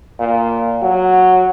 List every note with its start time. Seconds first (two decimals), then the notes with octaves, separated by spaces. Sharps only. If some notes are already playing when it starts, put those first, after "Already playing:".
0.19 A#2
0.82 F#3